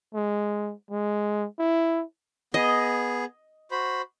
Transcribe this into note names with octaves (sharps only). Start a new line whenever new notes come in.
G#3
G#3
E4
B3 G#4 D#5
F#4 C5 B5